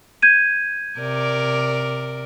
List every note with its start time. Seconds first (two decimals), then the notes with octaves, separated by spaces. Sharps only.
0.22 G6 G#6 D#7
0.99 C3 A#4 D5